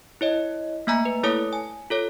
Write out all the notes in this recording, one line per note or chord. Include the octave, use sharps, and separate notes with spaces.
E4 C#5 D#5
A3 A#3 E5 G#5 A#5
B4
A3 E4 A4 C#5 A5 D#6
G#5
F4 A4 C#5